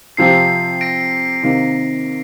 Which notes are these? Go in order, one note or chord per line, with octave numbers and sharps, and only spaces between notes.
C3 F3 C4 G4 C7
A#6 D7
C3 D#3 A#3